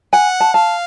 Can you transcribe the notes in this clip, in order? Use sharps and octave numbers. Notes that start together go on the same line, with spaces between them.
F#5 G#5
A5
F5 A5